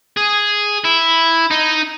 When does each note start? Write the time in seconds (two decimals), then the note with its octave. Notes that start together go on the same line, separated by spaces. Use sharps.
0.17 G#4
0.84 E4
1.51 D#4